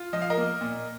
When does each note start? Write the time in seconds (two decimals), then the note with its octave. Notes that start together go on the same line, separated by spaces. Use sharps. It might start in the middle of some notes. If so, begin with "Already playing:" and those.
Already playing: F4
0.13 F3 D#5
0.22 F5
0.30 A#4 D#5
0.37 A#3
0.61 A#2